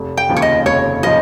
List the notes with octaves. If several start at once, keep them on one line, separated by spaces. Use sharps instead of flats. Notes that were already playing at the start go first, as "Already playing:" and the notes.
Already playing: F1
G5
D#2 C#3 F3
C#5
D#5
F1 C#5
C#3 F3 D#5